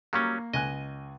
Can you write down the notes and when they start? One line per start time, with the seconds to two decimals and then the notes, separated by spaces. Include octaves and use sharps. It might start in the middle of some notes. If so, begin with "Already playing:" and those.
0.13 F#3 G3 A#3 C#4 C#6
0.53 C#2 D#5 G#5 F#6